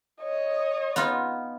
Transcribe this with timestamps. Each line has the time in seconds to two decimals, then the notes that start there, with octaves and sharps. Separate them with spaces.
0.21 C#5 D#5
0.96 B3 D#4 F4